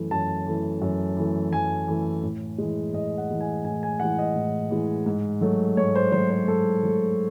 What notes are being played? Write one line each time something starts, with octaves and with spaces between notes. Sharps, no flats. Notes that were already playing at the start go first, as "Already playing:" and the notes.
Already playing: F#2 E3 A3
F#2 A5
E3 A3
F#2
E3 A3
F#2 G#5
E3 A3
A2
E3 G#3
A2 D#5
F#5
E3 G#3
G#5
A2 G#5
G#5
E3 G#3 F#5
D#5
A2
E3 G#3
G#2
F#3 A3
G#2 C#5
C5
F#3 A3 C5
C5
G#2 A4
F#3 A3